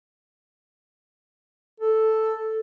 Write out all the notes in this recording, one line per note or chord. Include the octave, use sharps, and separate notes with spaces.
A4